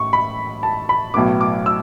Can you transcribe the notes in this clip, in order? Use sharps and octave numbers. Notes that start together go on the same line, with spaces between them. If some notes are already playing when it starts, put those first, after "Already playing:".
Already playing: A1 A2 C#6
B5
A5
B5
B1 A2 F#3 B3 D6
D6
E6